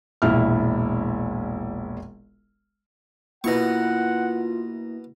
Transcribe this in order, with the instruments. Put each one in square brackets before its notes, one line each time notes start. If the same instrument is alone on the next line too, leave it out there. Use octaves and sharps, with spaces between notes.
[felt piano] E1 A#1 E4 F6
[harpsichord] B2 C#6 [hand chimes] A#3 E4 A#6 [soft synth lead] F4 [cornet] F#5